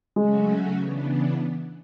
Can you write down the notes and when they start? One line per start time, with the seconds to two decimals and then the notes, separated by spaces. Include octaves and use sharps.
0.16 C#3 F#3 G#3 A3 C#4 F#4
0.75 C#3 E3 B3 D4